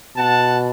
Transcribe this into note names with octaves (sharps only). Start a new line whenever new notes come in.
B2 F#5 A5